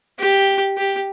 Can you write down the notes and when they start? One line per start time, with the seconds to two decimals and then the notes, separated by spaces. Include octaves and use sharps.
0.19 G4
0.77 G4